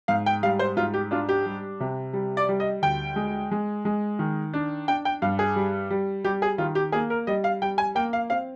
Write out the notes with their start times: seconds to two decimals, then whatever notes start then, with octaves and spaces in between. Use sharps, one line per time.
0.08 G#2 F5
0.26 G5
0.43 G3 F5
0.59 C5
0.77 G#2 F4
0.94 G4
1.11 D4 F4
1.29 G4
1.46 G3
1.80 C3
2.13 G3
2.37 D5
2.49 G3
2.60 D#5
2.82 D2 G5
3.16 G#3
3.51 G#3
3.85 G#3
4.19 D#3
4.53 D4
4.88 D4 G5
5.05 G5
5.22 G2 F5
5.39 G#4
5.56 G3
5.90 G3
6.24 G3 G4
6.42 G#4
6.58 D#3 F4
6.75 G4
6.92 A#3 G#4
7.10 A#4
7.27 G3 D#5
7.44 F5
7.62 G3 G5
7.78 G#5
7.95 A#3 G5
8.13 F5
8.30 C4 F5